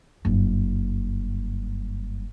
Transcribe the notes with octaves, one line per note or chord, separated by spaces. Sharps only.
F#1 G2